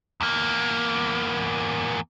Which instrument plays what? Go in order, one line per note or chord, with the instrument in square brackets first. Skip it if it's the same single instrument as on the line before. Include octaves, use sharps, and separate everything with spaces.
[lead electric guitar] E2 A#3